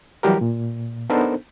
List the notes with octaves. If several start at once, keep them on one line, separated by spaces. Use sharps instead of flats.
E3 F#3 G3 G4 A#4
A#2
B3 D4 D#4 A4 A#4 C5